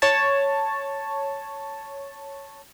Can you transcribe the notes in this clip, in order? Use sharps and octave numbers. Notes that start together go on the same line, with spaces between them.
C#5 A5